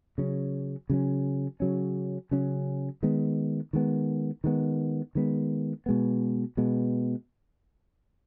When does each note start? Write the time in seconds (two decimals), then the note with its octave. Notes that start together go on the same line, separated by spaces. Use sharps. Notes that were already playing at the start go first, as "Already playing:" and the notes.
0.18 C#3 F#3 C#4
0.90 C#3 F#3 C#4
1.60 C#3 F#3 C#4
2.31 C#3 F#3 C#4
3.03 D#3 G#3 B3
3.73 D#3 G#3 B3
4.44 D#3 G#3 B3
5.15 D#3 G#3 B3
5.86 B2 G#3 B3
6.57 B2 G#3 B3